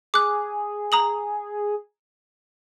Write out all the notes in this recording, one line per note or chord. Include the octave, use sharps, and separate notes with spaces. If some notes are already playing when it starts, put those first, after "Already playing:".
G#4 D6 F#6
A#5 D#6 F#7